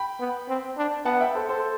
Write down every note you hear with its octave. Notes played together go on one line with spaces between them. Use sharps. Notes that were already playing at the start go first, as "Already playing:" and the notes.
Already playing: G5 B5
B3
C4
D4
B3 F#5 A5
E5 G5
A4 C5
A4 C5